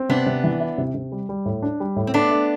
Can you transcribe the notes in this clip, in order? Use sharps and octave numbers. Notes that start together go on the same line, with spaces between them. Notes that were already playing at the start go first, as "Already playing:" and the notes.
Already playing: C4
C3 B3 D4
C3
E3
E4
C3
C3
G3
G3
A2
D4
G3
A2
C4
A3 B3 D4
A3